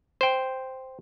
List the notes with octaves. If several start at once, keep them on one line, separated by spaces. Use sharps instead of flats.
C5 G5